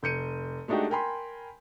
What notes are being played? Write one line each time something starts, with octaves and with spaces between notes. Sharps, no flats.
F1 G6 C#7 D#7
G#3 A3 D4 D#4 F#4 G4
A#4 G5 G#5 B5 C6